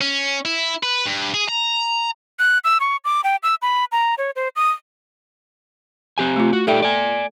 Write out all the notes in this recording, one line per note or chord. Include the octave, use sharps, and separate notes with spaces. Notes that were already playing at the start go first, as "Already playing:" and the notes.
C#4
E4
B4
G2
G#4
A#5
F#6
E6
C#6
D6
G5
E6
B5
A#5
C#5
C5
D#6
C4 G4 G#5
A3 F4
F#4
D#4 G4 A4 D5 E5 G5
D5 G#5